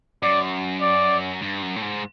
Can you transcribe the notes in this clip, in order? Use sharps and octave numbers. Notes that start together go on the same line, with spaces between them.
F#2 D5
D5
G2
F#2
A2
G#2